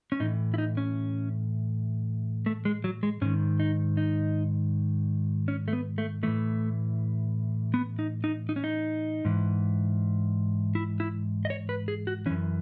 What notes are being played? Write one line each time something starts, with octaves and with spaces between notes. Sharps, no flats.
C#4
A2 E3 D#4
E4
D#4
C#4
A3
G#3
F#3
G#3
G#2 D#3 C#4
D#4
D#4
C#4
A3
B3
A3
A2 E3 A3
B3
D#4
D#4
D#4
C#4
D#4
G#2 E3
E4
E4
D#5
C#5
B4
G#4
F#4
F#2 E3 C#4